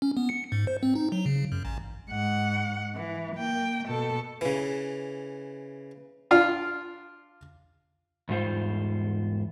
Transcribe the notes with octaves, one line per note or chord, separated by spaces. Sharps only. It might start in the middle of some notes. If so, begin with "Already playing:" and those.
C#4
B3
C#7
G#2
C5
C4
D#4
F#3
C#3
F#2
A1
G#2 F#5
E3
A#3 G5
B2 A4
C#3 E3
D4 F4 F5
E2 G#2 G3 F4 C5